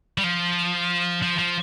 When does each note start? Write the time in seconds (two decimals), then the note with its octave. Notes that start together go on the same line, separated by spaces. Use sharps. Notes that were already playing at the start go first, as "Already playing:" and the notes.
0.18 G3
0.23 F3
1.22 F3
1.38 F3